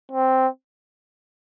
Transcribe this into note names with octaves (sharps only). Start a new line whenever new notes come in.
C4